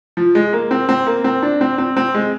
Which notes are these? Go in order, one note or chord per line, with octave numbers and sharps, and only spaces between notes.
F3
G#3
A#3
C4
C4
A#3
C4
D4
C4
C4
C4
G#3